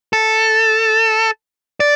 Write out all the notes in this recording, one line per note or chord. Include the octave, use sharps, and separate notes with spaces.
A4
D5